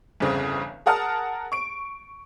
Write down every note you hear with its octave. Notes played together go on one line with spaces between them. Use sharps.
G1 E2 C#3 C4
G#4 A#4 F#5 A5 D#6 F6
C#6 D7